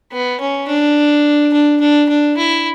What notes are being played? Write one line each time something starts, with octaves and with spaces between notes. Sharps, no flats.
B3
C#4
D4
D4
D4
D4
E4